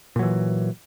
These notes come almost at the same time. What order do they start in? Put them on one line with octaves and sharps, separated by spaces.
A#2 F#3 E3